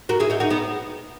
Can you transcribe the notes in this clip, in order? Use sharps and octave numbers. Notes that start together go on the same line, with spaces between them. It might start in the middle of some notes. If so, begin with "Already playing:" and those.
F#4 A#4
E4 G#4
D#4 F#4
D#4 F#4
B3 D#4